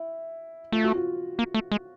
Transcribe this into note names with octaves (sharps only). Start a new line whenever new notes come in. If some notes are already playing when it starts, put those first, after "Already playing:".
Already playing: E4
A3 F4
F#4
F4
A#3
A3
G#3